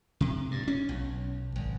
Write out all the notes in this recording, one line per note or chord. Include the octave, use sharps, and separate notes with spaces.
C3
G2
C#4
B1
G#1